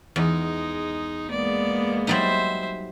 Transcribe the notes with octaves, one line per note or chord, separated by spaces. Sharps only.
E2 G#3 D#4
G#3 A#3 B3 D5
F#3 G3 D#4 C5 E5